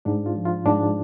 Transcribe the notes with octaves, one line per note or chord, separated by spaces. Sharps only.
G#2 D4
F4
F3
F4
G#2 D4